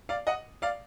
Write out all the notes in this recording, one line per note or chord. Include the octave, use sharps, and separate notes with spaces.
D5 F5
D#5 F#5
D5 F5